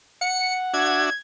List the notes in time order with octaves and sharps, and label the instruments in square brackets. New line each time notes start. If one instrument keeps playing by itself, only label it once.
[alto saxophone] F#5 [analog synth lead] C#7
[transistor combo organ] D4 F#4 E5 [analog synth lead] G#6